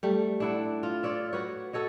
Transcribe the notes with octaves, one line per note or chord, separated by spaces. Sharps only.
G3 A3
D4 E4 F#5
F4
F4 C#5 D5 E5
F#4 B4 C#5
F#4 A4 C#5 D#5